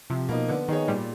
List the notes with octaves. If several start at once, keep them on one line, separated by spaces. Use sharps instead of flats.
C3 F3
B2 A#3 D#4
D3 B3
D#3 D#4 G#4 C#5
A#2 G3